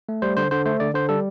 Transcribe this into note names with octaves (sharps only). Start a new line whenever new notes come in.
A3
G3 C5
D3 C5
D3 C5
A3 C5
D3 D5
D3 C5
G3 A4